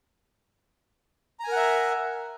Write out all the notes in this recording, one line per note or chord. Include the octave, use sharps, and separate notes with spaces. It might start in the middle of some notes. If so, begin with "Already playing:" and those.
A#4 E5 F#5 G#5 A#5